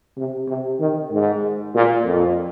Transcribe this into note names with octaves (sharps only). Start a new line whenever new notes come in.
C3
C3
D#3
G#2
A#2
F2